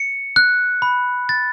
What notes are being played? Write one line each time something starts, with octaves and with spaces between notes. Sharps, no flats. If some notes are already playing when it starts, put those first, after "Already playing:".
Already playing: C#7
F#6
B5
A6